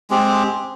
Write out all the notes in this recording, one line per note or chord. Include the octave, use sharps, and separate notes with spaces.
G#3 C4 G4